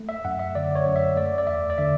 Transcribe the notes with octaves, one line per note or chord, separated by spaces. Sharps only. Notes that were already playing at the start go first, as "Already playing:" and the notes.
Already playing: A3
E5
F#2 F#5
E5
D3 D5
C#5
F#2
E5
A3 D5
D5
E2 E5
D5
D3 E5